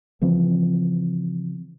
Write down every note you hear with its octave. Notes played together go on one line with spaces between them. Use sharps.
C#3 E3 F3 C4